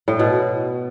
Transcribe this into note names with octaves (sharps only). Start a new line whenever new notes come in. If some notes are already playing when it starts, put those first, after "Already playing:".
A2
B2